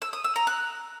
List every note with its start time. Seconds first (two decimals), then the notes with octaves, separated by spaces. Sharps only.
0.02 E6
0.13 D#6
0.24 E6
0.36 A#5
0.47 F#6